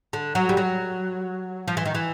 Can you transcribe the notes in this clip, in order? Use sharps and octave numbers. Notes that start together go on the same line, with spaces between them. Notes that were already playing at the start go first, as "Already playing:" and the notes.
D3
F#3
G3
F#3
F3
E3
D#3
E3